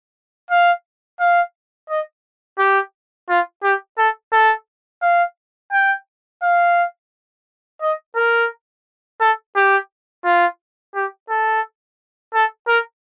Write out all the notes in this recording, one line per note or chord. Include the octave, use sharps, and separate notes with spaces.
F5
F5
D#5
G4
F4
G4
A4
A4
F5
G5
F5
D#5
A#4
A4
G4
F4
G4
A4
A4
A#4